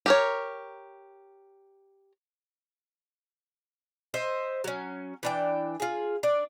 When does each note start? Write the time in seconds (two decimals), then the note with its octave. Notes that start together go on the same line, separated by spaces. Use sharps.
0.06 G4 A#4 C#5
4.14 C5 D#5 E5
4.64 F#3 C#4
5.23 E3 D4 G5
5.80 F4 G#4
6.23 D4 D5